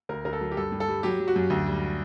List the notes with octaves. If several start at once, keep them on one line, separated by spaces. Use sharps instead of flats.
D2 A#4
D2 A#4
A4
F#3
G4
G2 A4
G2
A4
G3
F#3 G4
F#3
F#4
F#2
D2
G3